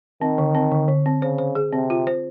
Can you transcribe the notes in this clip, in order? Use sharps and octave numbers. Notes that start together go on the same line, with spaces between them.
D#3 C4
D3
C4
D3
D3
C4
C#3 C5
C5
G#4
C3 C4
F4
C5